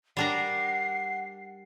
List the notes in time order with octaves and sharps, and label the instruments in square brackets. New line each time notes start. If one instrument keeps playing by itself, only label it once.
[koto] G3 D4 A#4 [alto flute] F#5 [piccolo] C7